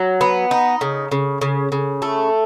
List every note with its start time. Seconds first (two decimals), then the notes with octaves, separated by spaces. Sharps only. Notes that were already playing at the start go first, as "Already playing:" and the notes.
Already playing: F#3
0.21 B3
0.51 D#4
0.81 C#3
1.11 C#3
1.41 C#3
1.72 C#3
2.02 A3